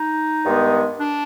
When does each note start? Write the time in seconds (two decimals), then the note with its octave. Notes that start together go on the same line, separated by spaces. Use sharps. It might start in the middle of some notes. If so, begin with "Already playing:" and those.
Already playing: D#4
0.46 G2 D#3 G#3 B3
1.00 D4